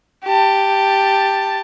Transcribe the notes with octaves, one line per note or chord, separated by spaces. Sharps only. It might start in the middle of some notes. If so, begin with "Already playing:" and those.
G4 A5